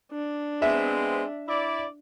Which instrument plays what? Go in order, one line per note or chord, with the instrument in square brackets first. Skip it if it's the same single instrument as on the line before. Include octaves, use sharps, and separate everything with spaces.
[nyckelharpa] D4
[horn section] G#3 B3 C4 [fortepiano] E5
[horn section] E4 D5